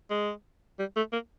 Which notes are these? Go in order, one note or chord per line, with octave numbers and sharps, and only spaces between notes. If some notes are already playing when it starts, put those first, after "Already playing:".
G#3
G3
A3
A#3